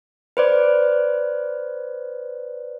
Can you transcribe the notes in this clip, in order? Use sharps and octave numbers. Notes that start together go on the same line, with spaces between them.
B4 C5 D5